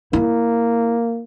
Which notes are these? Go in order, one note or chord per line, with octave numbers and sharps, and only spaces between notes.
A#3 E4